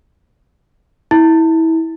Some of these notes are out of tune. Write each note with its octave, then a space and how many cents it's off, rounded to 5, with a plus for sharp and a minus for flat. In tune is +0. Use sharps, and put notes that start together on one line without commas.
E4 -25